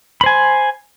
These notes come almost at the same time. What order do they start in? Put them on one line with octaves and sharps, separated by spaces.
B5 C5 G#5